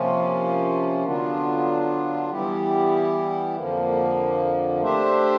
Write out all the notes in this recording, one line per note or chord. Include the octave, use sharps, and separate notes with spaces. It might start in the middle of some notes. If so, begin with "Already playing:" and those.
Already playing: C3 F3 A#3 C#4 F4
D3 F#3 B3 D4 F4
E3 G3 B3 E4 G4
F2 D3 F3 A#3
A3 D4 G4 C5 E5